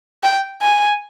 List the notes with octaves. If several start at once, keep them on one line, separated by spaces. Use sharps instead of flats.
G5
G#5